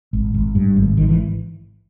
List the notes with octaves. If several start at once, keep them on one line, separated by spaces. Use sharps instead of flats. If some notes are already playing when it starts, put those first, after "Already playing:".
G#1
G#1
G2
G#1
G#1 D#3
E3